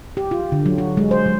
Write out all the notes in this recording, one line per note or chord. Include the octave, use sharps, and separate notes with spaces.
G4
F4
D3
F#3
F#4
G#3
C5
F#3